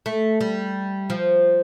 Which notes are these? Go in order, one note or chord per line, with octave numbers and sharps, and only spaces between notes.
A3
G3
F3